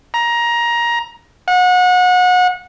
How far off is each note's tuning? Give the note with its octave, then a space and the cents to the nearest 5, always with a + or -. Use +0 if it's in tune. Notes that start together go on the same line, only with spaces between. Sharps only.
A#5 +20
F#5 -30